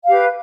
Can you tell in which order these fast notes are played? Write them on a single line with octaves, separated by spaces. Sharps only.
F5 G4 B4